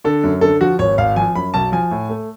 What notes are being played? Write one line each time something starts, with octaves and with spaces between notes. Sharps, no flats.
D3 A4
F#2
D3 A4
F3 F#4
G#1 C#5
G#1 F5
F3 G#5
F#2 B5
B1 A5
F3 G#5
A2
A3